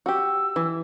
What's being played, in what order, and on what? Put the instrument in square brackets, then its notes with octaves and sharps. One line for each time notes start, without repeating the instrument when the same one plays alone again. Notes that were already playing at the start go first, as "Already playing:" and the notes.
[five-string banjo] F#4 G4 [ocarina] E6
[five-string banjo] E3